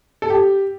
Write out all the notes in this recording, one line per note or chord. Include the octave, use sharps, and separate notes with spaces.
A4
G4